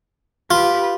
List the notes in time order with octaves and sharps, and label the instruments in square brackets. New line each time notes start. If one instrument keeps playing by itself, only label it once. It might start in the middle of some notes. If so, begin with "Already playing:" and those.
[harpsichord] F4 [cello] G4 B4